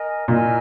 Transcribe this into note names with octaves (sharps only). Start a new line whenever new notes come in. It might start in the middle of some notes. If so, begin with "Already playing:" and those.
Already playing: A#4 D#5 G#5
A#2 E4 A#4 D#5 G#5